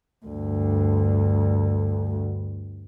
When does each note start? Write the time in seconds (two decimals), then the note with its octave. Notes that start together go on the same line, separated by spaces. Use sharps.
0.26 D2 G2